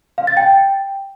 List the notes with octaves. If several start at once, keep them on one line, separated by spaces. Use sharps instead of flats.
F5
A6
G5